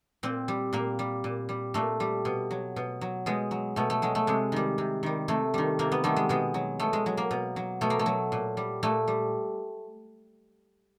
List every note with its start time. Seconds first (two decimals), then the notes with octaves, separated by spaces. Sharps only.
0.23 A#2 C4
0.48 G3
0.73 A#2 A#3
0.99 G3
1.24 A#2
1.49 G3
1.74 A#2 A3
2.00 G3
2.25 B2
2.51 F#3
2.76 B2
3.01 F#3
3.26 B2 G#3
3.51 F#3
3.76 B2 A3
3.90 A3
4.02 F#3 G#3
4.15 A3
4.27 C3 G#3
4.52 D#3 G3
4.78 C3
5.03 D#3 G3
5.28 C3 A3
5.54 D#3 G3
5.79 C3 A#3
5.92 B3
6.04 D#3 G3 A3
6.16 G#3
6.29 B2 G#3
6.54 F#3
6.80 B2 A3
6.93 G#3
7.06 F#3
7.17 A#3
7.31 B2
7.56 F#3
7.81 B2 A3
7.90 A#3
7.99 A3
8.06 F#3
8.32 A#2
8.57 G3
8.83 A#2 A3
9.08 G3